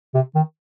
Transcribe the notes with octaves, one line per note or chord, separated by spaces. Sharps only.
C3
D#3